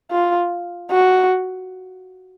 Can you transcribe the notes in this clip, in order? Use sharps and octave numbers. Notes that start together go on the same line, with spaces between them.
F4
F#4